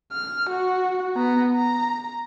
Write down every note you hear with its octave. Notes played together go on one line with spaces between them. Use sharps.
F6
F#4
B3 A#5
A#5